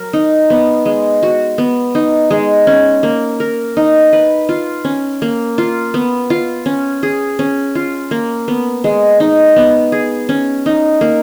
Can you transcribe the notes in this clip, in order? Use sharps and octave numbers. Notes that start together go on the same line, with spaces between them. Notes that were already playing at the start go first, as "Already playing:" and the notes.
Already playing: F#3 A#4
D#4
B3
G#3
F#4
B3
D#4
G#3
C#4
A#3
A#4
D#4
B4
F4
C#4
A#3
F4
B3
F4
C#4
G#4
C#4
F4
A#3
B3
G#3
D#4
B3
G#4
C#4
D#4
A#3